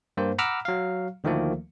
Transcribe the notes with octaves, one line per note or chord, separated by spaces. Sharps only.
G2 A#3 C5
F#5 A#5 B5 D6 E6 F6
F#3 F5
D2 D#3 F3 A3 A#3